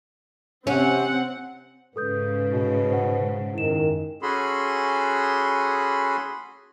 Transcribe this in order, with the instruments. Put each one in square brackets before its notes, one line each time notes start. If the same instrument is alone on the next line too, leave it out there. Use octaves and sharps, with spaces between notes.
[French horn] C3 [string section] C4 [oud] C#4 [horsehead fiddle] F#5
[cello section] G#2 C#3 [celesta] A4 D#6 G6 [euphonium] B4
[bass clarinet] B2
[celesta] C5 F#5
[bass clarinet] F#2 [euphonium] D#3 [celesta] E4 E7
[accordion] C#4 F#4 G#4 A4 B5 C6